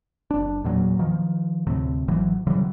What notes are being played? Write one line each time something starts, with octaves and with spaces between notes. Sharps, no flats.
F#1 D4
E2 A#2 F#3
D#3 F3
D2 A2 C3
G#1 E3 F#3
C#3 E3 F#3 G3